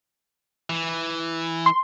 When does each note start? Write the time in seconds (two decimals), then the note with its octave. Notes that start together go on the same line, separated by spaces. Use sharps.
0.70 E3
1.66 C6